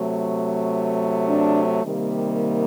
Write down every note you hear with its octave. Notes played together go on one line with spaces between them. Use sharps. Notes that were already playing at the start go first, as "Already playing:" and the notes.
Already playing: C3 F#3 A3
D4
C3 D#3 G3 A#3